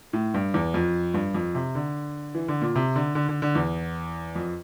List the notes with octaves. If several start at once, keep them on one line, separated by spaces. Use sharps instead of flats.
A2
G2
E2
F2
G2
F2
C3
D3
E3
D3
A#2
C3
D3
D3
D3
D3
E2
F2